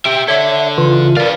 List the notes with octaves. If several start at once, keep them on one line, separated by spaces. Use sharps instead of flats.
G4 E5 G5
A4 C#5 D5 E5
C#3 E3 F4
A#4 B4 D5 F5